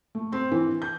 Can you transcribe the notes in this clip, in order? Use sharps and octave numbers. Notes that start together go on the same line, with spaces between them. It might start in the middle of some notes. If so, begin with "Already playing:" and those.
A3
C4
E3
G6